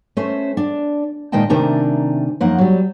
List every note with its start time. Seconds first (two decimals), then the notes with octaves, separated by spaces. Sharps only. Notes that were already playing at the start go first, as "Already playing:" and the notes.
0.17 A3 C#4 C5 E5
0.57 D4
1.32 A#2 D#3 G#3 D#5 G5 A5
1.50 C3 D#3 A3 D4 G#5 A#5
2.40 F#2 F3 A#3 D#4 F#5
2.58 F#3 G3